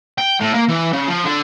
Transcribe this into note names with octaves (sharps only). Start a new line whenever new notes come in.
G5
A2
A#3
E3
C#3
F3
D3